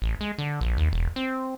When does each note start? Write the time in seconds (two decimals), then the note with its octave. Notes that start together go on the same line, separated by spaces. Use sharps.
0.02 A1
0.21 G#3
0.38 D3
0.61 A#1
0.77 D#2
0.93 E1
1.16 C4